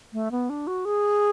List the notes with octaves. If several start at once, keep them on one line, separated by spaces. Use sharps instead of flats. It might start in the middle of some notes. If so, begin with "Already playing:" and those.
A3
B3
D4
F#4
G#4